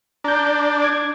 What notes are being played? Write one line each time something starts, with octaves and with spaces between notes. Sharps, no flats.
D4 A#5 G6
D6 G#6